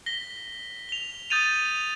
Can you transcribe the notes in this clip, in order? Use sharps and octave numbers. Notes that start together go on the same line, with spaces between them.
A#6 B6 G7
F7 G7
D#6 G6 A6 D#7 F7